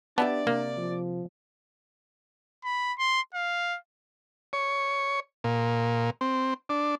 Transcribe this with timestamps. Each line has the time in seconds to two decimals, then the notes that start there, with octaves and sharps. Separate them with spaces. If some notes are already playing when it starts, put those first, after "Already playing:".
0.18 B3 D4 G4 D5 E5 A5
0.47 C3 A#3
0.77 F3
2.64 B5
2.99 C6
3.34 F5
4.53 C#5
5.44 A#2
6.21 C4
6.69 D4